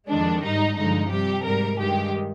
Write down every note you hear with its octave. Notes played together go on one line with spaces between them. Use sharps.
F2 D#3 G#3 D4
G#2 G3 D#4
G2 D3 F3 G#3 D#4
C3 G3 G4
G#2 G3 A#4
G2 D#3 G#3 G4